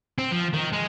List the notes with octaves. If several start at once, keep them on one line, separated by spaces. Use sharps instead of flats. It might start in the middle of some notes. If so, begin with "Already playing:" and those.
C4
F3
D#3
G#3